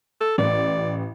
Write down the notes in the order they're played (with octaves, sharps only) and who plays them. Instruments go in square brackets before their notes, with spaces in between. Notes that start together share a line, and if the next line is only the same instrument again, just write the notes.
[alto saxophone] A4
[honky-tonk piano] A1 [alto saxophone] D5